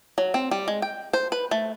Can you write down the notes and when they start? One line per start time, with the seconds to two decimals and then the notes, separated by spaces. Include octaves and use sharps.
0.18 F#3
0.34 C4
0.51 G3
0.68 G#3
0.82 G5
1.13 C5
1.32 B4
1.51 A3